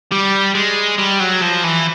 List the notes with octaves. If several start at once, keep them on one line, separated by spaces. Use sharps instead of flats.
G3
G#3
G3
F#3
F3
E3